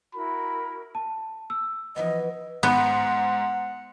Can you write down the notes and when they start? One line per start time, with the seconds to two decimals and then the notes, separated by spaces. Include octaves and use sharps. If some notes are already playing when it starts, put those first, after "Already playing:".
0.14 E4 F#4 A#4 B5
0.95 A5
1.50 E6
1.96 E3 F3 B3 D#5
2.63 G#2 B3 F#5